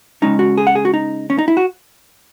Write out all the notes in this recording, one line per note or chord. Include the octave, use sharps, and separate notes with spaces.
C#3 G#3 C#4 D#4
F#4
G#4
F#5
G#4
F#4
D#4
C#4
D#4
E4
F#4